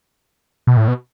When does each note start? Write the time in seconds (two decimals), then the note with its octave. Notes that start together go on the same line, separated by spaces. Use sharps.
0.67 B2
0.77 A2
0.88 B2